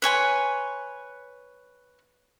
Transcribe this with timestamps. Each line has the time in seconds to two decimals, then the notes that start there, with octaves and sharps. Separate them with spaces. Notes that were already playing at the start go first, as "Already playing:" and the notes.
0.02 B4 C#5 G#5 C6